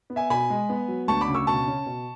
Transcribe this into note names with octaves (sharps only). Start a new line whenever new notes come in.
B3
E5 G#5
B2 G#5 B5
G#3
B3
F#3
D2 A5 C#6
B5 D6
C#3
C#6 E6
B2 A5 C#6
C#4
B2